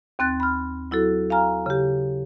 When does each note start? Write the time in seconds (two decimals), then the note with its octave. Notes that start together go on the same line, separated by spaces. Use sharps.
0.19 D#2 C4 F#6 A6
0.40 B5 F6
0.91 F#3 E4 F#4 A4
1.30 F5 G#5 A#5 F6
1.66 C#3 G4